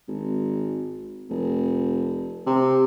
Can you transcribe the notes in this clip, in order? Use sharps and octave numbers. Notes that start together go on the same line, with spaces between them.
G#1
F1
C3